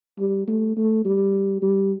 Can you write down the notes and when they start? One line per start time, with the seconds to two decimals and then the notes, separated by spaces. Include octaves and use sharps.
0.19 G3
0.48 A3
0.77 A3
1.05 G3
1.62 G3